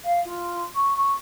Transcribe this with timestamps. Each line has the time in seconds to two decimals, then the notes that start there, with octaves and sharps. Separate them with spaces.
0.04 F5
0.25 F4
0.75 C#6
0.96 C#6